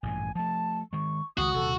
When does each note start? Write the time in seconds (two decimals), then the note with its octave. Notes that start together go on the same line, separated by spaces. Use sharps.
0.03 A1 G2 A#2 G#5
0.35 F3 A3 A5
0.93 D#3 G#3 C#6
1.38 C#2 D#3 G#3 F#4 D#6
1.54 D#1 C3 A4